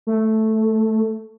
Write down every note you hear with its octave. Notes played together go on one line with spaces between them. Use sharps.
A3